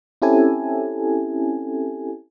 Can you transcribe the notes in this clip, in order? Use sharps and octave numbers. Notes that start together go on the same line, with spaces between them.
C4 C#4 E4 G4 A4 G#5